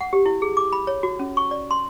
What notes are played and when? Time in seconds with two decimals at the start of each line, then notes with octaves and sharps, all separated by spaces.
0.01 F#5
0.13 G4
0.26 E4
0.42 G#4
0.57 D6
0.72 B5
0.87 C#5
1.03 F#4
1.19 C#4
1.37 C#6
1.51 D5
1.71 C6